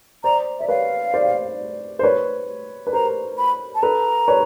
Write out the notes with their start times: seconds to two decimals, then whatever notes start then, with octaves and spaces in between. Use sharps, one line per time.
0.24 C5 D5 A#5
0.59 D5 E5
0.68 B4 C#5 F5
1.14 C5 D5
1.99 C5
2.03 B4 C#5
2.87 B4
2.93 A#4 C5 A#5
3.38 B5
3.75 A5
3.83 A4 B4 A#5
4.28 B4 C#5